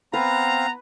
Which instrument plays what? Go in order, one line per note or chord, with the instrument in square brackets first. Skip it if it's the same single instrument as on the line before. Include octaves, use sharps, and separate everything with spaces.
[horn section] B3 F#5 A#5 [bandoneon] C4 F5 [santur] B4